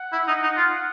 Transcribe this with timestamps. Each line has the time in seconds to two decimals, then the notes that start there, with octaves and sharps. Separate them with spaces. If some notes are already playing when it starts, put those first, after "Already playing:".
Already playing: F#5
0.12 E4
0.27 D#4
0.43 D#4
0.57 F4